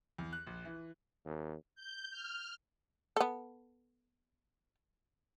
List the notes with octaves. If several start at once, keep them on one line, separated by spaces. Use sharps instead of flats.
E2
F#6
A#1
E3
D#2
G6
F6
B3 A4